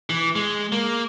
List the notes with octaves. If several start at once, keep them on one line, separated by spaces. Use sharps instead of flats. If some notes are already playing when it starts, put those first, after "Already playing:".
E3
G#3
A#3